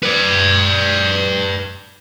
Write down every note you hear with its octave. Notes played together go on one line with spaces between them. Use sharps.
B4 D5